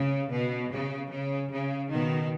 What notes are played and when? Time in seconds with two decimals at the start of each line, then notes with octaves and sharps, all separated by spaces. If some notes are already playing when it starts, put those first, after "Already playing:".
Already playing: C#3
0.30 B2
0.71 C#3
1.10 C#3
1.51 C#3
1.90 B2 D#3